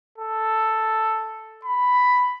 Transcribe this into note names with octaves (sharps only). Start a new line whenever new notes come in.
A4
B5